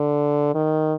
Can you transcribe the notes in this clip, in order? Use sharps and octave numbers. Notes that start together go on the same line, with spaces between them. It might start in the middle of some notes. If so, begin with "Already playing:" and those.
Already playing: D3
D#3